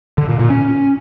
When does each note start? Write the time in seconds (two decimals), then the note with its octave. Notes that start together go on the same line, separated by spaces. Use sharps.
0.18 D3
0.29 A#2
0.39 A#2
0.50 C#4